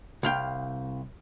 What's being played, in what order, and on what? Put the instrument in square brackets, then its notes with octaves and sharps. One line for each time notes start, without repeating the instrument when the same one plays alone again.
[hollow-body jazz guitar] C2 F5 G5